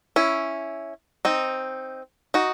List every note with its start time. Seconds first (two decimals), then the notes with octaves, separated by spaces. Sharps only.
0.16 C#4 E4
1.25 C4 D#4
2.34 D#4 F#4